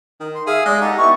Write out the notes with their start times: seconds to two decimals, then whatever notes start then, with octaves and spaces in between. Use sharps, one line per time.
0.20 D#3
0.35 C6
0.47 G#4 E5 F5
0.66 G#3 D5
0.82 D#4 G4 A4 F#5
0.98 B3 E4 C#6